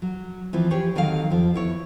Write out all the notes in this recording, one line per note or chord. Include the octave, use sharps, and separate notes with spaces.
F#3
E3 F3 C4 E4
F4 G4 G#4 C5 C#5
D3 D#3 F#3 C4 A#4 F5
F2 F3
B3 E4 C#5